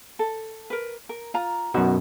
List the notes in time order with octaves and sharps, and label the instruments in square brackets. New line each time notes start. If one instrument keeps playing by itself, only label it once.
[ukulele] A4
A#4 B4
A#4
F4 A#5
[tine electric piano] F#2 B2 [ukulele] D#4 F#4 D#5